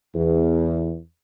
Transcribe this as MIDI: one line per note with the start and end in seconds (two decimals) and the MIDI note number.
0.15 0.97 40